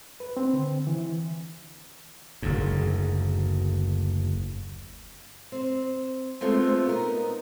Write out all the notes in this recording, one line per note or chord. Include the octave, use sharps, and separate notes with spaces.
B4
C4
D3
E3
F#1 D2 G#2
C4
G#3 A3 B3 C4 F4
B3 D#4 A#4